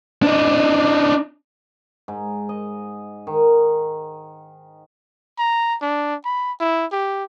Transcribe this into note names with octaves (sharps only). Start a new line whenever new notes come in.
D4 D#4
G#2
D#5
D#3
A#5
D4
B5
E4
G4